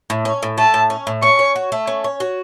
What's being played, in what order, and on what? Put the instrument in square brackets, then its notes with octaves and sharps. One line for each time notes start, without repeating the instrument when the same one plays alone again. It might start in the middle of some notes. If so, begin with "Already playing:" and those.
[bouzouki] A2
C#4
A2
[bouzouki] A3 [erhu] A5
[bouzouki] A2
C#4
A2
[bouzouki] C#4 [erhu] C#6
[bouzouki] C#5
F#4
A3
C#4
C#5
F#4